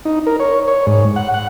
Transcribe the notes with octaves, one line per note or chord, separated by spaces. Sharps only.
D#4
A#4
C#5
C#5
G#2
F#5
F#5